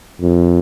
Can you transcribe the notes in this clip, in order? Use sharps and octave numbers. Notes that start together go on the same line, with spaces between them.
F2